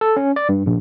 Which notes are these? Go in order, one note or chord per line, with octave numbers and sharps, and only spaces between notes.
A4
C#4
D5
G2
A#1